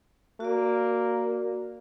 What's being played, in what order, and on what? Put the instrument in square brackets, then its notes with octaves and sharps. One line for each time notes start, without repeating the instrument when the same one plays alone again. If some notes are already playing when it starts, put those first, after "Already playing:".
[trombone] A#3 [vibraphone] F#4 D5